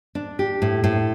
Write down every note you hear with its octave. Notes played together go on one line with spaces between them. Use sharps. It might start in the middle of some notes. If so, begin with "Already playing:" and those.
D4
G4
A2
A2